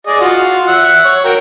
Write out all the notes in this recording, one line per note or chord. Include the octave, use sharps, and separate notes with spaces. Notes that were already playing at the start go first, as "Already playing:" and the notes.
G#4 D5 D#5
F4 F#4
E5 F#5
C#5
F#4 A#4 G5